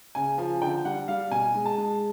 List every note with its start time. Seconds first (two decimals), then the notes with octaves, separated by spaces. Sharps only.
0.15 C#3 G#5
0.38 F3 G#5
0.62 D3 G5
0.85 G3 F#5
1.08 G3 F5
1.31 B2 G#5
1.54 G#3
1.66 A5
1.78 G#3